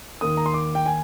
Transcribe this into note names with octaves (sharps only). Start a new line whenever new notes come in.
D#2 D#3 A#3 D#6
A#5
C6
D6
G5
G#5